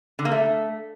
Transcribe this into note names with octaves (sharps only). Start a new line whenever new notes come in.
D3
A#3
A3